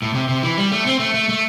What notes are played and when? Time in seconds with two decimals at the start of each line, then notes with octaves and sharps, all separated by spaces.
0.02 A2
0.14 C3
0.29 C3
0.42 E3
0.57 G3
0.72 A3
0.86 C4
1.00 A3
1.14 A3
1.29 A3